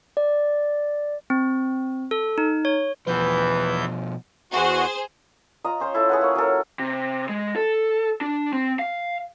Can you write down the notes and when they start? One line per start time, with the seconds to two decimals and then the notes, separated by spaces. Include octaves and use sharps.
0.17 D5
1.30 C4
2.11 A4
2.38 D#4
2.65 C#5
3.07 E2 B2 E3 F3 B4 G6
4.52 E2 F#4 G#4 C5
5.64 F4 D#5 A#5
5.80 C#4 C5 C#5
5.94 E4 A4
6.09 G#4 B4 F#5
6.21 A#3 C#5
6.35 F#3 C#4 A4 A#4
6.79 C3
7.29 G#3
7.56 A4
8.21 D4
8.53 C4
8.79 F5